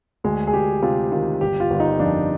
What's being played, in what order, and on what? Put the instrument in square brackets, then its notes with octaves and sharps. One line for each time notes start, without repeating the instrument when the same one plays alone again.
[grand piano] D2 G#3
G#4
D2 G4
C3 F4
D#3 F4
G1 G4
F4
G1
D#4
F2 D4